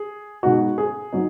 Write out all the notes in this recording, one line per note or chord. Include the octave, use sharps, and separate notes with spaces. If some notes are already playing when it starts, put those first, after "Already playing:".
Already playing: G#4
B2 G#3 D#4 F#4
G#4
F#3 D#4